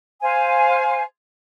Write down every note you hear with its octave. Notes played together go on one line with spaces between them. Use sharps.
C5 F5 G#5